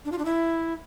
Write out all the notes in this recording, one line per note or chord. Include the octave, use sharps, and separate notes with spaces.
D4
F4
D4
E4